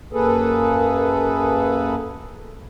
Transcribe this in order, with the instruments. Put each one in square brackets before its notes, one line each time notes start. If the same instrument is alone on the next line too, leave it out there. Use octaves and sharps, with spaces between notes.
[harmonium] F#2 A#3 G#4 A4 B4